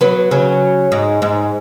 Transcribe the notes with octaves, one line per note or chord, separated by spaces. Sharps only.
F#3 B3
C#3 F#3
G#2
G#2